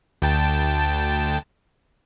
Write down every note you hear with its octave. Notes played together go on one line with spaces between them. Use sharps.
D2 G5 A5